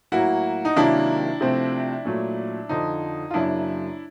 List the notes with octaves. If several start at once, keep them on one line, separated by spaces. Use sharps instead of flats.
A2 F#3 A#3 E4 F#4
D#4
C3 D#3 F#3 A#3 D4 E4
C3 F3 A3 C4
A#2 F#3 A3
F2 D3 F3 D#4
F4
F#2 C#3 F#3 A#3 D4 E4